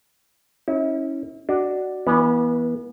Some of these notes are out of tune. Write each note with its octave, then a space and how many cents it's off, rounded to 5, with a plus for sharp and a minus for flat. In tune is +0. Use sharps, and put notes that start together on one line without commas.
C#4 -20 E4 -40
D4 +0 F#4 +10 D#5 +5
E3 -5 B3 -30